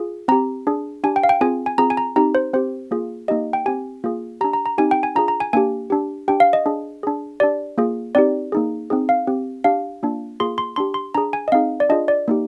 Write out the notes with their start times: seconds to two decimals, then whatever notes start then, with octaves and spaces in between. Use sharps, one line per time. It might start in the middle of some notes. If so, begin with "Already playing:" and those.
Already playing: F4 G#4
0.28 C4 G4 A#5
0.67 D4 G#4
1.04 D4 G4 G#5
1.16 G5
1.23 F5
1.29 G5
1.41 C4 F4 G#4 G#5
1.66 G#5
1.78 C4 F4 G#4 A#5
1.90 G#5
1.97 A#5
2.16 C4 D#4 G4 A#5
2.35 C5
2.53 C4 G4 C5
2.91 A#3 F4 G#4
3.28 A#3 D#4 G4 D#5
3.53 G5
3.66 C4 G4 G#5
4.04 A#3 F4 G#4
4.41 D4 G4 A#5
4.53 A#5
4.66 A#5
4.78 C4 D#4 G4 G#5
4.91 G5
5.03 G#5
5.15 D4 F4 G#4 A#5
5.28 A#5
5.40 G#5
5.53 A#3 D4 G4 G#5
5.90 D4 G4
6.28 D4 G4 G5
6.40 F5
6.53 D#5
6.66 D4 G#4
7.03 D4 G#4
7.40 D4 G4 D5
7.78 A#3 F4 G#4
8.15 C4 D#4 G4 D5
8.52 A#3 D#4 G#4
8.90 C4 D#4 G#4
9.09 F5
9.27 C4 G4
9.64 D4 G4 F5
10.03 A#3 D4 F4
10.40 A#3 F4 G#4 C6
10.58 C6
10.76 D4 G4 C6
10.94 C6
11.15 D4 G#4 A#5
11.33 G#5
11.48 D#5
11.52 C4 D#4 G#4 F5
11.80 D5
11.89 D4 F4 G#4 D#5
12.08 D5
12.28 A#3 D#4 G4